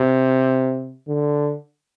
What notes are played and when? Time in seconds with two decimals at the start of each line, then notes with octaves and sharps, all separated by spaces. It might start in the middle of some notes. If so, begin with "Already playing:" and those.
Already playing: C3
1.08 D3